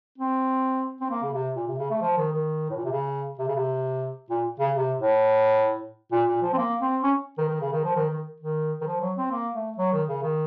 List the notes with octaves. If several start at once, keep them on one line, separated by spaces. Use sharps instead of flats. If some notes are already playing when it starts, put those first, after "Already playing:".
C4
C4
A#3
C#3
C3
A#2
C3
C#3
A3
F3
D#3
D#3
A2
A#2
C3
C#3
C3
C#3
C3
A#2
C#3
C3
A2
A#2
A#2
F3
C4
A#3
C4
C#4
D#3
D#3
C#3
D#3
F3
D#3
D#3
D#3
D#3
F3
F#3
C4
A#3
A3
F#3
D#3
C#3
D#3